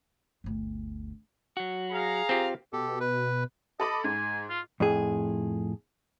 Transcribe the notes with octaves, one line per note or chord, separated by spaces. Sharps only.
G1 D2
F#3 F#4
G#4 F5 A#5
C4 F4 G4
B2 G4 A4
B4
A4 D#5 B5 D6
G#2 G#5
F4
F2 A2 G#4